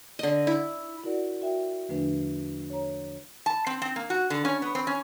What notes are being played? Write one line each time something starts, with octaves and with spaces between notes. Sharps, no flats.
D3 D#5
E4
E4 F#4 A#4 D5 F#5
F#4 A#4 E5 G5
E2 D3 F3 A3 D4 B4
C#5 A#5
A5
C4
C4
A#3
F#4
D3
C#4
B3
C4
C#4